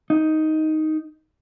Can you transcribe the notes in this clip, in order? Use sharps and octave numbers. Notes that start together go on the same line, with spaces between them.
D#4